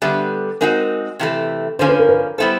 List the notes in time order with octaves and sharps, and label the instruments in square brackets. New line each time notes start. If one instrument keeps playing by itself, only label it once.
[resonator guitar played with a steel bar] D3 G3 B3 [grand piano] E5
[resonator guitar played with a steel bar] G#3 C4 D#4 F#4 [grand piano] A#4
[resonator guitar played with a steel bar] C3 E3 A3
[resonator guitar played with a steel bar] D3 F3 A#3 C#4 [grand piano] C5
[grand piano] B4
A#4
B4
[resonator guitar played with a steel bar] G3 B3 E4 A4 [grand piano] C5